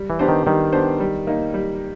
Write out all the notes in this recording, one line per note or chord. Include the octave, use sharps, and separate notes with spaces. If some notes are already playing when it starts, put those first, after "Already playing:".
Already playing: G3
E3
B3 D4 G4 C5
D#3
D#3 G3
B3 D4 G4 C5
G3
A#3 D#4
G3